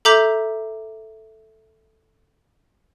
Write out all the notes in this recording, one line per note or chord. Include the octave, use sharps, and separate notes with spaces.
A4 E5 A#5 D6 G6 B6